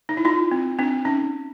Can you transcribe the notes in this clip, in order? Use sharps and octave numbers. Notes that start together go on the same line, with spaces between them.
D#4
E4
D#4 F4
C4
C4 D4
C#4 D#4